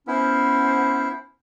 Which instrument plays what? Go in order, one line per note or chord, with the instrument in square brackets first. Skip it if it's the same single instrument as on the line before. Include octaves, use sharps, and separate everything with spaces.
[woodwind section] B3 C#4 C5 [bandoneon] E4